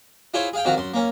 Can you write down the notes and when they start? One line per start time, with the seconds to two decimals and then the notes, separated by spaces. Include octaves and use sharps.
0.34 E4 F4 G#4 C5 C#5
0.53 G#4 F5 G5
0.65 F2 D#3 F#4 F5
0.77 F#2 C6
0.94 A#3 C#4